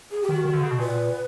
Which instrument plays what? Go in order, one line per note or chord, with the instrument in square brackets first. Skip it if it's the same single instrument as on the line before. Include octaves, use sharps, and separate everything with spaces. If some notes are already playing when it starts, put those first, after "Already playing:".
[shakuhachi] G#4
G4
[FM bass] D#3
[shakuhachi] F#4
[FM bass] D#3
D3
C#3
B2
[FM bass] A#2 [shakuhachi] B4